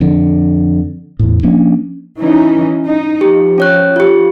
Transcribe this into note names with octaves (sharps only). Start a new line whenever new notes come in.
F2 D3
E2 A2
F3 A#3 C#4 D4
E3 C#4 D#4
D#4
F3 G4
C#4 C#5 F#6
F4 G4